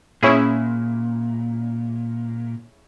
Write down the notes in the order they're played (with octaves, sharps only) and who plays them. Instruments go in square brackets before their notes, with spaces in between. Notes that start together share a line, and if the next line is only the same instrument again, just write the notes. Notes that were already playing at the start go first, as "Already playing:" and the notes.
[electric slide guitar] A#2 [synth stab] C#4 E4 G#4